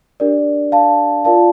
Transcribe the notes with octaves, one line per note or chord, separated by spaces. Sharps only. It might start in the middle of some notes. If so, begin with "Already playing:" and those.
D4 G4 A#4 D5
F5 A5
F4 A#4 D5 F5 A5